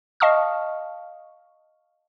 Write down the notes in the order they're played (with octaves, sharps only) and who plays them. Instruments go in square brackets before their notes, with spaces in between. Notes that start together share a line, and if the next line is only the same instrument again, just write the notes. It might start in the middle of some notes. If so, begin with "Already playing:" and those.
[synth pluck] D#5 F5 A5 C#6 D#6 F6